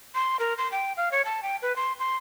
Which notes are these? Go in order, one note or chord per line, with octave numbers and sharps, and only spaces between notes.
C6
A#4
C6
G5
F5
C#5
A5
G5
B4
C6
C6